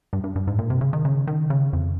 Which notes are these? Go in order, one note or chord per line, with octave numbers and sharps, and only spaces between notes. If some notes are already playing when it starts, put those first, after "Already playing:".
G2
G2
G2
G#2
A#2
C3
C#3
D#3
C#3
D#3
C#3
F2